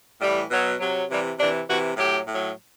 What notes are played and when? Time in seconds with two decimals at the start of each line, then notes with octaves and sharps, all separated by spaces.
0.21 A2 E3 G3
0.51 B2 F#3
0.80 C3 F#3
1.10 C3 E3 G3
1.38 C3 E3 D4
1.68 C3 E3 F#4
1.97 A2 F#3 G4
2.27 A2 F#3